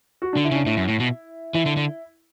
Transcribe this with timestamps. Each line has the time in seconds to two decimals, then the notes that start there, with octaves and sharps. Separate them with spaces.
0.22 F#4
0.33 D3 D4
0.44 E4
0.51 C#3 D4
0.66 A2 E4
0.77 F#2
0.88 A2
1.00 B2
1.54 E3 E4
1.66 D3
1.77 D3